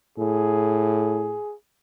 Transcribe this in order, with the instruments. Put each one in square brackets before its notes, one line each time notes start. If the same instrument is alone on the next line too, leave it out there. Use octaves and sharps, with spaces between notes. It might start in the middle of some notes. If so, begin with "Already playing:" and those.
[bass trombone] A2 [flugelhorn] G#4